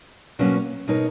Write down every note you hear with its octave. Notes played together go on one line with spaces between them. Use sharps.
B2 F#3 A#3 C#4
B2 G#3 D#4 A#4 C#5